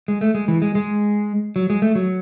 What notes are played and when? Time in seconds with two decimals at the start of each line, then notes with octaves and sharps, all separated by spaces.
0.08 G#3
0.21 A3
0.35 G#3
0.48 E3
0.62 G#3
0.75 G#3
1.56 F#3
1.70 G#3
1.82 A3
1.95 F#3